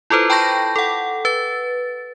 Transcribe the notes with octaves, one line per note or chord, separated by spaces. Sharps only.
E4 F4 A4 B4 C5
G5 A5 B5 C#6 G6 A#6
A4 F#5
B4 A6